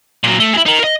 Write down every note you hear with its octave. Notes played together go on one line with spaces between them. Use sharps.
A#2 F#3
A3
E4 G#4
D#4 A#4
A#4 D#5